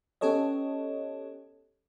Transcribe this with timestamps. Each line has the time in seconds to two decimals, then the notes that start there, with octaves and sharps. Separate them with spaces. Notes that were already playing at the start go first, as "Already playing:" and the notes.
0.21 B3 C#4 G4 A4 C#5 D#5